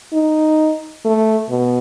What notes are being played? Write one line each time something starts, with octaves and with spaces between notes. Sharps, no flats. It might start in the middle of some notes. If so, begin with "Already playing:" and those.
D#4
A3
B2